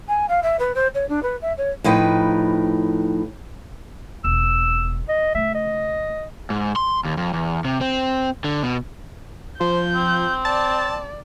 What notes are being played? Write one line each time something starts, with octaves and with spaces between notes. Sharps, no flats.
G#5
F5
E5
B4
C5
C#5
D4
B4
E5
C#5
A2 F3 D#4 B4 G5
E1 E6
D#5
C#3 A3 E5
D#5
G#2
C6
D#2
F2
E2
C3
C4
D3
B2
F3 C5 G6
C4
D5 A5